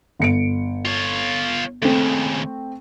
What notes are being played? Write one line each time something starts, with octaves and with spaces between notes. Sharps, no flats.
G1 C#7 D7
F4 C#5
D#2 C#3 A3 C4